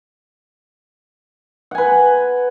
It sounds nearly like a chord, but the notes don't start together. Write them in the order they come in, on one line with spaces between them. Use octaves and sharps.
F#5 G#5 B4